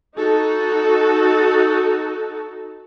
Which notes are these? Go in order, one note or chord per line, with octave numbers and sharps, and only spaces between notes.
D#4 F#4 A4